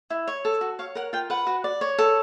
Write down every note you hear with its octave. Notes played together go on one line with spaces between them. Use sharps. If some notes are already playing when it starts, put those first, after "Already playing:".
E4
C#5
A4
F#4
C#5 F5
A#4 F#5
F4 G5
B4 F#5
F#4
D5
C#5
A4